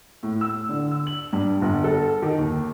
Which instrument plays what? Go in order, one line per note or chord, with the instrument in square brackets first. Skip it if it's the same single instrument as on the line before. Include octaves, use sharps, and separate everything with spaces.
[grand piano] A2
E6
D3
E6
F#7
G2
G1
A4
D#3
D#2